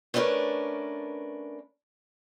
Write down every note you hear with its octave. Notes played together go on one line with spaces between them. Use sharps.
A3 B3 C#4 D4 A#4 B4